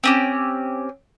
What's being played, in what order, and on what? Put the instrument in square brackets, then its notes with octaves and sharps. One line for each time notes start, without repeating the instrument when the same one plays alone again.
[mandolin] C4 C#4 G4